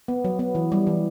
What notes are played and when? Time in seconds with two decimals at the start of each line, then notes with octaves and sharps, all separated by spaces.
0.08 B3
0.24 F#3
0.39 B3
0.55 E3
0.72 G3
0.87 E3